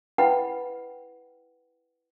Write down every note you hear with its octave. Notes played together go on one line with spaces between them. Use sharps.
E4 B4 D#5 F#5 G5 B5